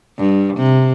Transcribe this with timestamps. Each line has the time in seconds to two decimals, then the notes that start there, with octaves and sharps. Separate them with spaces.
0.17 G2
0.57 C3